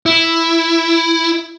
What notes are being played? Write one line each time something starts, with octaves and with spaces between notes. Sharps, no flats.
E4